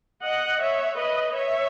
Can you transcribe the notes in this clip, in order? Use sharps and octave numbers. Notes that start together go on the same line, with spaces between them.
D#5 F#5
C#5 E5
B4 D#5
C#5 E5